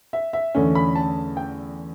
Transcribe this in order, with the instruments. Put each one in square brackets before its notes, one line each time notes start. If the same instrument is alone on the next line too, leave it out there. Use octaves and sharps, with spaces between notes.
[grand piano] E5
E5
E2 D3 A3 C#4
B5
A5
G5